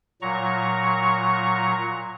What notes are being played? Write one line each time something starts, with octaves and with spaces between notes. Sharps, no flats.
A#2 F#3 A#5 C#6